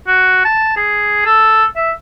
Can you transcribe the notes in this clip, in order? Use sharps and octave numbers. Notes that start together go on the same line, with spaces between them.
F#4
A5
G#4
A4
E5